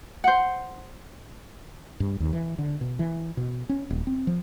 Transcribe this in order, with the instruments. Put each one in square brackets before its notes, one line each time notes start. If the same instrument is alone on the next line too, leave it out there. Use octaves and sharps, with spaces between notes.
[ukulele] C5 F#5
[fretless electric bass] G2
D#2
E3
D3
B2
E3
B2
C#4
D#1
C4
F3